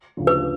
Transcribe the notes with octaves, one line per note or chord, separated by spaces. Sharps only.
D2 C#3 F3
B4